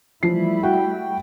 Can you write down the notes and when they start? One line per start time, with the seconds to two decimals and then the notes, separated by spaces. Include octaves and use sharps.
0.23 E3 F3 G3 A3 E4 C7
0.63 F#4 F#5 G5